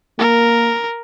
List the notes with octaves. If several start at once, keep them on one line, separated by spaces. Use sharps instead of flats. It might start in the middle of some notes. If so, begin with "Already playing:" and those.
A#3 A#4